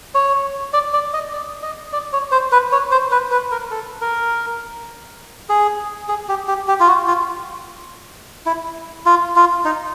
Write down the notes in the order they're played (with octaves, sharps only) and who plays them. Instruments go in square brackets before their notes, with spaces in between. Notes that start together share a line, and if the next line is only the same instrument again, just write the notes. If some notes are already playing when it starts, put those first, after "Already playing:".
[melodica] C#5
D5
D5
D#5
D5
D#5
D5
C#5
C5
B4
C#5
C5
B4
B4
A#4
A4
A#4
G#4
G#4
G4
G4
G4
F4
F#4
F4
E4
F4
F4
D#4